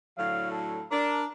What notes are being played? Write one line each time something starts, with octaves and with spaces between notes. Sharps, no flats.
A2 D3 F#3 F5
A4
D4 A#4